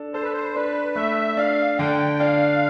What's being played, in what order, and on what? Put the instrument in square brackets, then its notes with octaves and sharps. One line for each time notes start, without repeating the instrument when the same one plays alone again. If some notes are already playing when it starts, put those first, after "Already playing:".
Already playing: [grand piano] D4 A4
[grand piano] A4 [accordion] C5
[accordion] B4
C5
[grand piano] D4 [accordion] B4
[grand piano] A3 [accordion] E5
[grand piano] D4 [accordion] F5
[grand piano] D3 [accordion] G5
[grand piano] D4 [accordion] F5